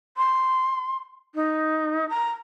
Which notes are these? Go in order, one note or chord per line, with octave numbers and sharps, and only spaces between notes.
C6
D#4
A#5